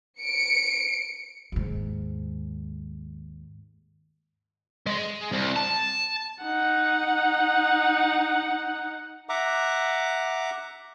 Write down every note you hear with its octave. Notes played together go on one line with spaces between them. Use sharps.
C#7 D7
D#2 G#2
G#3
C2
A5
D#4 F#5
E5 F#5 A#5 D6